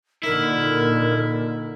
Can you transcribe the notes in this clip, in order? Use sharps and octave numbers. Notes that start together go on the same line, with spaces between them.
A#2 D3 D#4 E4 A#4